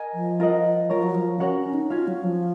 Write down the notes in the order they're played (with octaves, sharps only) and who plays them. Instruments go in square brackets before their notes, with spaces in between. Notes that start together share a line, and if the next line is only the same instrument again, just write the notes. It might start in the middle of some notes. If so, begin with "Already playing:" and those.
Already playing: [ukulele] A#4 D#5 G#5
[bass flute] F3
[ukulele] F4 A#4 D#5 F#5
[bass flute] F3 [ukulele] F4 A#4 C#5
[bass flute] F#3
F3
[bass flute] C#4 [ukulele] F#4 A#4 C#5 F#5
[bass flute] C#4
D#4
[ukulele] C#4 F#4 C#5 F5 [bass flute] F4
[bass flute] F#3
F3